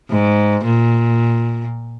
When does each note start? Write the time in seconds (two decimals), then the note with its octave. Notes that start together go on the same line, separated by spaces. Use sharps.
0.10 G#2
0.65 A#2